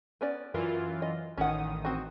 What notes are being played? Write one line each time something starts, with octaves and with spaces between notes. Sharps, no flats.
B3 C#4 D5
F#2 E3 F4 A#4
D#5
A1 D#3 C#4 F#5 D#6
C4 F#4